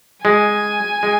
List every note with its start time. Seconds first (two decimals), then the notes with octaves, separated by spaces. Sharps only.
0.25 G#3 G#5
1.03 G#3